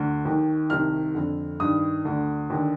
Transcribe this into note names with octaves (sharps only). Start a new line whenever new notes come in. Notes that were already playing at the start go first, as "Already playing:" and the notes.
Already playing: D2 D3
D#2 D#3
C2 C3 D#3 F6
F2 D3
G2 D#3 D#6
D2 D3
D#2 D3